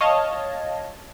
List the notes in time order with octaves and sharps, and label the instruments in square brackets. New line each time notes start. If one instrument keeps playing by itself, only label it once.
[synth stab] C#5 D#5 F5 A5